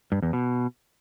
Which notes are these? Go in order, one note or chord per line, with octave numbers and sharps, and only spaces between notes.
G2
E2
B2